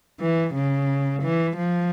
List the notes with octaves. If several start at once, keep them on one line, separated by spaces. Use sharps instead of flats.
E3
C#3
E3
F3